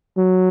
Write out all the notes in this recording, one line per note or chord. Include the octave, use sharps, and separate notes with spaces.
F#3